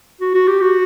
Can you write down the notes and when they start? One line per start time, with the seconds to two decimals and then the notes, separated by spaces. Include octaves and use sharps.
0.21 F#4
0.34 F#4
0.47 G4
0.61 F#4